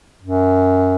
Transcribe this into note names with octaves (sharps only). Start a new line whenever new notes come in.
F#2